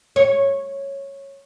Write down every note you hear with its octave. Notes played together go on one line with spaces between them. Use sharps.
C#5